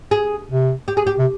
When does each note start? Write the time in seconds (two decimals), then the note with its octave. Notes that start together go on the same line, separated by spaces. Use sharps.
0.11 G#4
0.50 C3
0.88 G4
0.97 G#4
1.07 G4
1.18 C3